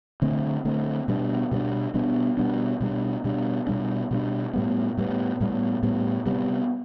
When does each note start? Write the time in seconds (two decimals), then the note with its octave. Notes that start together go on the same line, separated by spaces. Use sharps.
0.22 D3 A3 C4
0.65 D3 A3 C4
1.08 B2 G3 B3 D4
1.51 B2 G3 B3 D4
1.94 B2 G3 B3 D4
2.37 B2 G3 B3 D4
2.80 B2 G3 D4
3.24 B2 G3 D4
3.67 B2 G3 D4
4.11 B2 G3 D4
4.53 A2 G3 B3
4.98 A2 G3 B3
5.40 A2 G3 B3
5.83 A2 G3 B3
6.26 C3 G3 B3